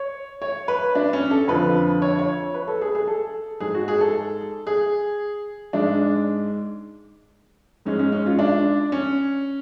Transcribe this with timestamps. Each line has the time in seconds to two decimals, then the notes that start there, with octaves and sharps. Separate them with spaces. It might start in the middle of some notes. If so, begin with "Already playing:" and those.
Already playing: C#5
0.42 C#5
0.68 B4
0.95 D4
1.13 C#4
1.31 A4
1.48 F2 D3 F3 B4
2.02 C#5
2.19 C#5
2.54 B4
2.68 A4
2.81 G#4
2.95 G#4
3.07 A4
3.60 G#2 G#3 G#4
3.74 F#4
3.88 G#4
4.01 A4
4.67 G#4
5.73 G#2 G#3 D4
7.85 G#2 G#3 C#4
7.99 C#4
8.12 C#4
8.26 F4
8.39 D4
8.92 C#4